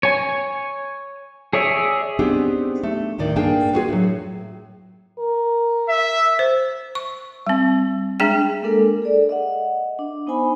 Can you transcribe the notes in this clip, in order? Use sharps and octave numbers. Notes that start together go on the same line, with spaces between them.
C#5 G#5
G#4 C#5 D5 E5
B3 C4 D4 D#4 G4 G#4
A3
D#2 A2 D#3 D5
G2 A#3 D4 G#4 G5
B3 F4 F#4 G#4 B4
A2 F#3
A#4
E5
C5
C#6
G3 C4
G#3 D4 G#4 G5
G#3 A#3 D4 A4 A#4
A#4
G#4 A4 D5
D#5 E5 F#5
D4
B3 D#4 C5 G#5 B5